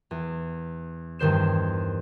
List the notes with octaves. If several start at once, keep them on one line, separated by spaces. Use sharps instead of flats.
E2
E2 G2 D#3 C5 E7